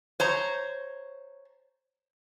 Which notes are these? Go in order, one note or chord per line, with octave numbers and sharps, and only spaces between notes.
C5 C#5 A#5